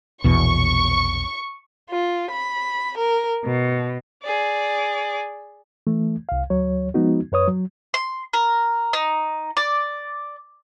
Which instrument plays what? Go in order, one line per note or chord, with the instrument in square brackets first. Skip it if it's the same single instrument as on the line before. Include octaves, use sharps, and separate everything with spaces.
[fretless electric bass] A#1 E2 B2 [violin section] C#6
[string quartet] F4
B5
A#4
B2
[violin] G#4 D5
[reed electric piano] E3 A3
C2 F5
D2 F#3 C#5
F3 G#3 B3 D#4 F#4
F#2 B4 C#5 D#6
F#3
[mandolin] C6
A#4
D#4
D5